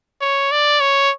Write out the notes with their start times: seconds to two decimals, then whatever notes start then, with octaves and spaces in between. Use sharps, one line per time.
0.21 C#5
0.51 D5
0.80 C#5